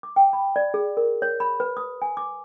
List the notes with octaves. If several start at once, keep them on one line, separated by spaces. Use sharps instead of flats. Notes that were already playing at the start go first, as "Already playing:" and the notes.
D6
G5
B5
D5
G#4
A#4
C#5
B5
B4
D#6
G#5
D6